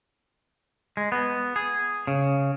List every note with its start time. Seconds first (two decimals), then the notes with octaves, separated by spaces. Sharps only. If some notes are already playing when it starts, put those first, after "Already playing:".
0.97 G#3
1.12 B3
1.56 G#4
2.07 C#3